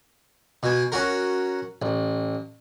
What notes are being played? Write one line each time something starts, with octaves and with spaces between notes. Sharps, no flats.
B2 G#5
C#4 F#4 A#4
A1